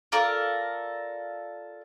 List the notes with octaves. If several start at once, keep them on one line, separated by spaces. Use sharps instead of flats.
F4 A4 A#4 D5